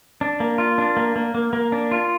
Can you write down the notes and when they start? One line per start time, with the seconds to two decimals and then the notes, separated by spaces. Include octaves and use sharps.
0.21 D4
0.40 A#3
0.58 F4
0.78 D4
0.97 A#3
1.16 A#3
1.34 A#3
1.53 A#3
1.72 D4
1.91 F4